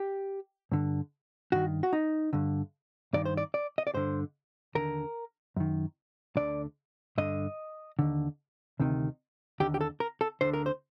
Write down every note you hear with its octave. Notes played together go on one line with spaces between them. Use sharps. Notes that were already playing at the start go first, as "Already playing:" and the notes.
Already playing: G4
G2 D3
G2 D#3 F#4
F#4
D#4
G2 D3
G2 D#3 D5
C5
D5
D5
D#5
D5
G2 D3 C5
D#2 D3 A#4
F#2 D#3
D2 D3 D5
G2 D3 D#5
D#2 D3
D2 C3 D#3
D#2 D3 G4
G4
A4
A#4
A4
D2 D3 C5
A#4
C5